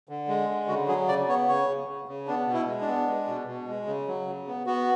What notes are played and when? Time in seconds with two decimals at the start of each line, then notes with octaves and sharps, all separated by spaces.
0.09 D3
0.28 G#3
0.49 D3
0.68 C#3 F#4
0.88 F#3 G#4
1.08 C#3 D5
1.28 B3 C#5
1.48 C#3 C#5
1.68 C#3
1.88 C#3
2.08 C#3
2.27 B3 D4
2.47 B2
2.54 E4
2.67 G#3
2.81 D4
2.88 B3
3.07 G#3
3.28 B2
3.47 B2
3.68 G#3
3.86 C#3
4.08 F#3
4.26 C#3
4.47 B3
4.66 B3 F#4